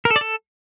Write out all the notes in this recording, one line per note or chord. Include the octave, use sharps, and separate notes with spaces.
A#4
A4
D5
A4